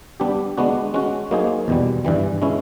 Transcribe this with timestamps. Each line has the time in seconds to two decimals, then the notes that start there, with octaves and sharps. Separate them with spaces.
0.20 G3 B3 D4 G4
0.57 G#3 B3 D4 F#4
0.94 G#3 C#4 F#4
1.31 F#3 A#3 D#4 G#4 C5
1.68 E2 B2 G3
2.05 G2 E3 G3
2.42 G#3 C#4 E4